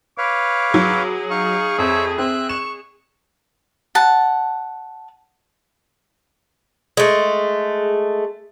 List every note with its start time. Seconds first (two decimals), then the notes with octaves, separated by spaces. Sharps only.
0.18 B4 C#5 F5 D6
0.74 F#3 G#4
1.31 D#4 F5 C#6
1.78 F2 C5 C#5 E5
2.18 C4 E5 F#6
2.49 C#6 E7
3.95 F#5 A5
6.97 G#3 A3